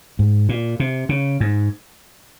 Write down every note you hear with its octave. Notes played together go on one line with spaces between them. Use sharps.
G#2
A#2
C3
C#3
G#2